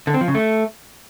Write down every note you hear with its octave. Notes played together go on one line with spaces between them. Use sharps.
D3
C4
F3
C#3
A3